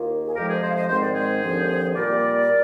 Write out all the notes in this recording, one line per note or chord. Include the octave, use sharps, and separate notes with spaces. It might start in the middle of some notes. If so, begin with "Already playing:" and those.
Already playing: D#2 D#3 A#3 F4
G#4
F2 C3 F3 G#3 G4 A#4
G#4 C5
C5 D#5
F5
C5 D#5
G#2 D#3 G#3 C4 C5
D5
G#4 C5
D#2 D3 F3 C4
A#2 G3 A#3 A#4 D5
A#2